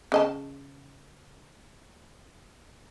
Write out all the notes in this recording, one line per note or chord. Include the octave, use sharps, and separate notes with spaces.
C#3 D#5 A5